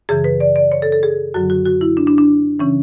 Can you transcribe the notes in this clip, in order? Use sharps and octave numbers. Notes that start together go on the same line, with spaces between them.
F#2 C#3 E3 G#4
B4
D5
D5
C#5
A4
A4
G#4
F#2 D3 F#3 F#4
F#4
F#4
E4
D4
D4
D4
C#3 E3 C#4